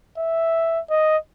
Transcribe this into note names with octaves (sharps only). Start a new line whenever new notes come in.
E5
D#5